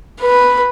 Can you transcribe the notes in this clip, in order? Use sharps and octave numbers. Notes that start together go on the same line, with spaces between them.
B4